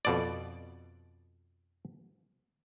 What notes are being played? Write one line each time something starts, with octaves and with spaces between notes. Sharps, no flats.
F2 B2 D5